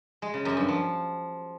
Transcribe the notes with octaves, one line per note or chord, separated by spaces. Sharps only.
G#3
C#3
F#2
G2
F3